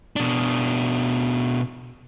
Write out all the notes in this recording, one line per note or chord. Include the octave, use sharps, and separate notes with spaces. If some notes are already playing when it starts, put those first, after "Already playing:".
B2 D4